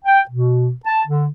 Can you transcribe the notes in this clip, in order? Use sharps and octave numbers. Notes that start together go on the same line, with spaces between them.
G5
B2
A5
D3